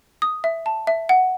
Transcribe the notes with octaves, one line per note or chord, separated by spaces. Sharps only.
D#6
E5
A5
E5
F#5